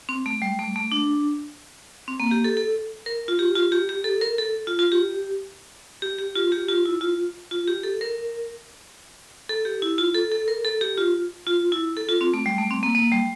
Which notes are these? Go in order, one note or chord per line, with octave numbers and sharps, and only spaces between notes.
C4
A3
G3
A3
A3
D4
C4
A#3
G4
A4
A4
A#4
F4
G4
F4
G4
G4
A4
A#4
A4
F4
F4
G4
G4
G4
F4
G4
F4
E4
F4
F4
G4
A4
A#4
A4
G4
E4
F4
A4
A4
A#4
A4
G4
F4
F4
E4
A4
F4
C4
A3
G3
A3
C4
A#3
A#3
G3